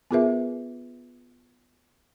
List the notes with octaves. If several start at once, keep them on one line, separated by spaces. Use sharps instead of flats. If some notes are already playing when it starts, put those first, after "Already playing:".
B3 F4 G#4 A#4 B4 E5